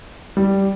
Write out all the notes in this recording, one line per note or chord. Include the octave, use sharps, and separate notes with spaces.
G3